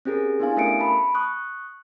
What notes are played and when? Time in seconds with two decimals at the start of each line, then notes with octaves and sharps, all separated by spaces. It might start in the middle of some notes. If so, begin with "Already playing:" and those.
0.05 C4 C#4 G4 G#4 A#4
0.40 B3 D4 E4 G4 F5 G#5
0.57 A3 C#4 A#4 E5 C#7 D7
0.79 A5 B5
1.15 C#6 D#6 F#6